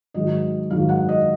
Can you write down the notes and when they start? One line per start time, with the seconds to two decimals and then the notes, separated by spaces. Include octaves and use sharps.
0.14 G#2 D#3 F#3 D#5
0.70 G#2 D#3 F#3 F5
0.89 F#5
1.09 D#5